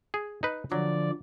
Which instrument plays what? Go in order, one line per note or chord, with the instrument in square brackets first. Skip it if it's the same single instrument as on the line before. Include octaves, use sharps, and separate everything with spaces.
[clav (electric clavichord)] G#4
D#4 B4
[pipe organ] D3 F3 D5 [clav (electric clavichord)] F#3